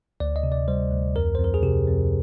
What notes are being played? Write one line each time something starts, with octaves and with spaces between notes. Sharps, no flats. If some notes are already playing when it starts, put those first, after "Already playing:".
D2 D5
D#5
C3
D5
G3 C5
D2
F2 A#4
C5
F2 A#4
G#4
C3 G4
F2